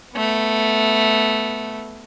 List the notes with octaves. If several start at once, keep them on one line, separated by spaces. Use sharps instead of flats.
A3 B3